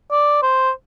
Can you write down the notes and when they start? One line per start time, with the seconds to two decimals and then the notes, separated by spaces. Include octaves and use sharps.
0.11 D5
0.43 C5